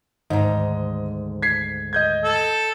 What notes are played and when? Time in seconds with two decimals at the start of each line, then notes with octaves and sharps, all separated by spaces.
0.30 D2 G#2 D#3 D#5 A#5
1.42 G#6 B6 C7
1.93 D#5 G6 G#6
2.24 A4